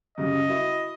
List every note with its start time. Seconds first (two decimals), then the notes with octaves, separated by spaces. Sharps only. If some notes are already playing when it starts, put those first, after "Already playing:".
0.18 F#2 C#3 G3 D#5
0.49 E4 F#4 E5